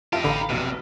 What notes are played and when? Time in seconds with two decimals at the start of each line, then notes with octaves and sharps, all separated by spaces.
0.13 F1 D#4 F4 G4 E5 A5
0.24 A1 D3 F5 A#5 B5
0.49 F1 B1 C3